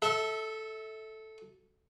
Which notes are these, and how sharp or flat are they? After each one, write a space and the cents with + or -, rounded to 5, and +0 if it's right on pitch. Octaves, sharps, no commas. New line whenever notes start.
A4 -5 E5 -30